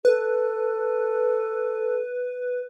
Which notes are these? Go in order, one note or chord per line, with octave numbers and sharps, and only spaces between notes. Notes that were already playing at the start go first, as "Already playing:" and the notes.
A4 B4